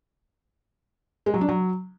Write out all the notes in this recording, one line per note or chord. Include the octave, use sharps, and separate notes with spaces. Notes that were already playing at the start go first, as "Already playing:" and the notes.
G#3
F#3
D4
F#3